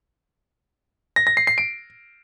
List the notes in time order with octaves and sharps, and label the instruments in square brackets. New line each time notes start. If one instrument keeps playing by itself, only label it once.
[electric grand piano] A#6
A#6
C7
C7
D7